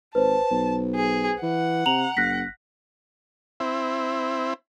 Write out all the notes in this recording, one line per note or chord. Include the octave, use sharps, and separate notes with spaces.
G#1 B4 C5 A5
B1
G#4
E3 F#5
C3 A#5 F7 F#7
F#1 F#6 A#6 B6
C4 E4